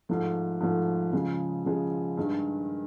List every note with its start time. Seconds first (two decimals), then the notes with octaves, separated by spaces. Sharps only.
0.09 G#2 F3 A3
0.60 G#2 F3 A3
1.13 C#3 F3 G#3
1.66 C#3 F3 G#3
2.17 G2 D#3 G#3